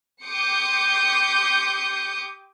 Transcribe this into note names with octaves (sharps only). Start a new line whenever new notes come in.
G4 C6 D6 D#6 G6 C#7